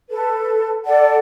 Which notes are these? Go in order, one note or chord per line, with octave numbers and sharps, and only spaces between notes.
A4 B4
A4 D5 F#5